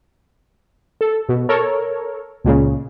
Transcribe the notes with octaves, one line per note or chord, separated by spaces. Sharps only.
A4
B2
A4 A#4 C#5
C#2 A#2 C#3